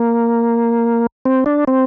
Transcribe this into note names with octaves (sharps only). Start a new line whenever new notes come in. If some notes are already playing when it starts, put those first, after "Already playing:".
Already playing: A#3
C4
D4
C4